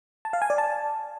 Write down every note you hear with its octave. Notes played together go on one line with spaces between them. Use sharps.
A5
F5
G#5
D5
A5